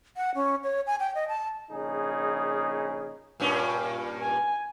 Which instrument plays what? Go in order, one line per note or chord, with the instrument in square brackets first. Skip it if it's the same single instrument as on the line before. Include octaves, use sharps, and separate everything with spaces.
[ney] F#5
C#4
C#5
G#5
G5
D#5
A5
[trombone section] A#1 C#3 D#4 G#4
[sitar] G2 A#2 C#4
[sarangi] G#5